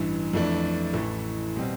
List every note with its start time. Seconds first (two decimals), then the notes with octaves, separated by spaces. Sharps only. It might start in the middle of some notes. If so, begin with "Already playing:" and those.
Already playing: A1 G2 E3
0.33 F2 E3 A3 D4
0.93 A1 A2 E3 A3
1.56 B2 G3 C4